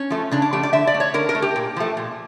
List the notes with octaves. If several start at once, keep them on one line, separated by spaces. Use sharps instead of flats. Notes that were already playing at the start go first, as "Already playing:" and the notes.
Already playing: C#4
F3 A3
C#3 D4
D4
F3 A3 G4
D5
D3 E5
D5
A3
C#5
D3 A#4
A#4
A3
G4
A#2
F3 A3
A#2